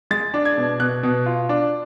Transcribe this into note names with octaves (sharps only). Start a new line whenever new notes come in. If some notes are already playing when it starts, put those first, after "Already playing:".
G#3 A6
D4
G#6
B2
B2 F#6
B2
F4
D4